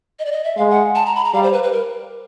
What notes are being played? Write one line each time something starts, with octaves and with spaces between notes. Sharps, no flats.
D#5
D5
D#5
E5
G#3 F5
F#5
A5
A#5
B5
A#5
G3 F5
C5
B4
B4
A#4